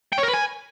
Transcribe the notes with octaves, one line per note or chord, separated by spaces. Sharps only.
G5
C#5
A#4
B4
G#5